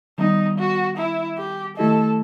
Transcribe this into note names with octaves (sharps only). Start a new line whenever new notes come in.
D#3 G3 B3 D#4
F#4
E4
G4
D#3 A3 E4 G4 A4 D#5